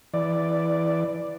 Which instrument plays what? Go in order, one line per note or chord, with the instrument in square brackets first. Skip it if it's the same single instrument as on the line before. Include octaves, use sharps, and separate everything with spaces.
[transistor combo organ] E3 D5